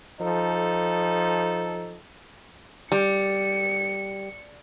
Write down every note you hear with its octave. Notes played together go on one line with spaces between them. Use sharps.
F3 D#4 A4
G3 C#7